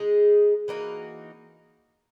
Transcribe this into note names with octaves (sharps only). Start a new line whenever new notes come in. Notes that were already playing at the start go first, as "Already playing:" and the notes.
Already playing: G#3 D#4 G#4
E3 A#3 D#4 F#4